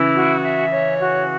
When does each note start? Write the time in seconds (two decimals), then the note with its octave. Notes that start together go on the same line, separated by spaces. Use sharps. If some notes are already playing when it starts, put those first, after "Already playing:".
Already playing: C#3 E3 E4
0.14 F#4
0.43 E5
0.71 C#5
0.99 F#4